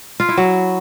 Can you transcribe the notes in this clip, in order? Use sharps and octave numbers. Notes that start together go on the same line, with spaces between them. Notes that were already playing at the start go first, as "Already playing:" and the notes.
F4
E4
F#3